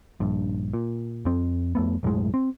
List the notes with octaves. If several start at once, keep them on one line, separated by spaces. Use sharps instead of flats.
A#1 G2
A#2
F2 C4
F2 A3 B3
B1 F#2 A2 G#3
C4